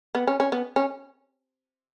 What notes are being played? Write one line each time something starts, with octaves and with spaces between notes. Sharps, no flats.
B3
C#4
C#4
B3
C#4